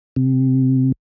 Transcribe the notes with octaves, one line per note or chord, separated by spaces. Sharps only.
C3